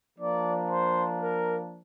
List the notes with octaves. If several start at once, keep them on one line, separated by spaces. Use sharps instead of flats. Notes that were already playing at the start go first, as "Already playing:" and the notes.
F3 A#3 D4 D5
C5
A#4